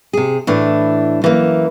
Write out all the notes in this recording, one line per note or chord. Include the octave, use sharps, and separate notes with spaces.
C3 G#4
A2 E3 D4
F#2 E3 A#3